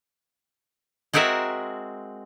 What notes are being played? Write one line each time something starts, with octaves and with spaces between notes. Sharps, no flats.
G#3 C4 F#4 A#4 E5